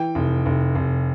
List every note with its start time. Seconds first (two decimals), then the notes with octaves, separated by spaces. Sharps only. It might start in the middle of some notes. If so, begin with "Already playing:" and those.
Already playing: E3 G5
0.15 F1
0.46 F1
0.75 F1